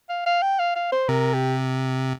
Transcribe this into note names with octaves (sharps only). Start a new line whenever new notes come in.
F5
F5
G5
F5
F5
C5
C3 A#4
G4